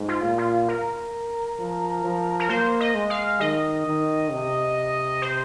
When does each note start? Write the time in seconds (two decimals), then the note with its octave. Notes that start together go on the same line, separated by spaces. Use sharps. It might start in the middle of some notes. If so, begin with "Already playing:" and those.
Already playing: G#2
0.08 F4
0.24 A#2
0.38 F4
0.68 A#4
1.59 F3
2.04 F3
2.40 A#4
2.50 A#3 C5
2.81 D#5
2.95 G#3
3.10 F5
3.40 D#3 D#5
3.86 D#3
4.32 C3
5.22 C5